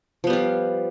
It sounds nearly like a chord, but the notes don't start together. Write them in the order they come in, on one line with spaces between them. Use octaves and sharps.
F3 B3 G3 F4